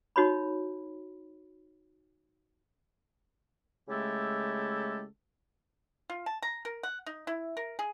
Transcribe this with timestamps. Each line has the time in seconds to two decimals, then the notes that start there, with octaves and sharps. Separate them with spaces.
0.16 D#4 F#4 C#5 B5
3.88 C#3 G#3 A3 E4 G4 A4
6.10 F4
6.26 A5
6.42 A#5
6.65 A#4
6.83 F#5
7.06 D#4
7.27 E4
7.57 A#4
7.79 G#4